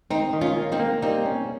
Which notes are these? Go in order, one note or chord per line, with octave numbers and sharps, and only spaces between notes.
D#3 C4 D#4
D#3
C#4 F4
A#3
C4 D#4
A#3
G3 C4 D#4
C#4